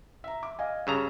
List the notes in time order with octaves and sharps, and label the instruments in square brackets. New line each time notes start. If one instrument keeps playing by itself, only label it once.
[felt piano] E5 A#5
D6
D#5 F5 G#5
[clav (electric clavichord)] G2 C#3 A#5 [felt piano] E6